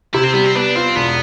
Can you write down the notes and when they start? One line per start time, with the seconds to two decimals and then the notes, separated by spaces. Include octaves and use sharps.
0.14 C3 E4
0.24 C4
0.34 G3 B3
0.44 C4
0.55 B3 D4
0.75 C4 F4
0.95 E1 B3